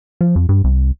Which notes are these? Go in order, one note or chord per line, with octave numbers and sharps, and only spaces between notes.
F3
F2
G2
C2